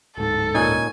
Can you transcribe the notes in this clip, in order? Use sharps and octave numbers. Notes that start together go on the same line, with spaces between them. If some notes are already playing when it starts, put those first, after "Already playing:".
D1 G#2 A4
A#2 C#4 D#4 G#5